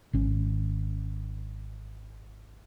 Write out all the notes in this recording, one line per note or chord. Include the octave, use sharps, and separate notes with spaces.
G#1 C#4